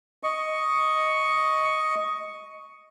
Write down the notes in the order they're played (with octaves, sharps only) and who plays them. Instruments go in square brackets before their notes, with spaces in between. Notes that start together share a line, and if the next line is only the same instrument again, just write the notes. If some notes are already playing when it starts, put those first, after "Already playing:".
[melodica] D#5 C#6